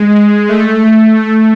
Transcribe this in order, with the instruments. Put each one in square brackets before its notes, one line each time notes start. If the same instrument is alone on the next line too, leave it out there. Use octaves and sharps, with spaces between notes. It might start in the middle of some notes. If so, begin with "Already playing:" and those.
Already playing: [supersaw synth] G#3
G#3
A3